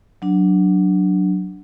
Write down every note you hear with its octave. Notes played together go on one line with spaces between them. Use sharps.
F#3 D4